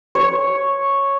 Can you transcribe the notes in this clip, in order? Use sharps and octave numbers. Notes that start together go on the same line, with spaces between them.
C#5